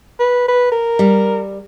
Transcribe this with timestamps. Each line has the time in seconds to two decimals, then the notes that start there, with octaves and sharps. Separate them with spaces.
0.19 B4
0.48 B4
0.72 A#4
0.99 G3